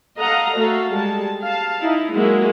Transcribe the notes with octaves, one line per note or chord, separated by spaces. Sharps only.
A4 D#5 F5 F#5 A#5
A3 F#4 A4 F5
G3 G#3 A5
F5 A5
D#4 E4
F#3 G#3 A#3 E4 F#4